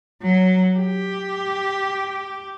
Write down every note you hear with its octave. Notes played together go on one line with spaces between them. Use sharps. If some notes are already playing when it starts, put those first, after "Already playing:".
F#3
G4